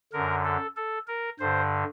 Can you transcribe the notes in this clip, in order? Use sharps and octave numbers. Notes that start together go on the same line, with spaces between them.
F#2 D3 A#4
A4
A4
A#4
G2 D3 C5